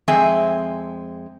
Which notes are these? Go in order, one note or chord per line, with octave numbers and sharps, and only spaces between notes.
F2 G#3 C4 E5 G#5